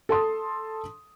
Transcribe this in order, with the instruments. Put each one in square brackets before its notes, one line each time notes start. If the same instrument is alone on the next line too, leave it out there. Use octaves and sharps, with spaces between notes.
[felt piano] A4 A5 C6 D#6